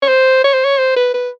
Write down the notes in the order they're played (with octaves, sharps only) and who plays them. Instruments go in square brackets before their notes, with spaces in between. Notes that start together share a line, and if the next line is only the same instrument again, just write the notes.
[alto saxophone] C#5
C5
C#5
C5
C#5
C5
B4
B4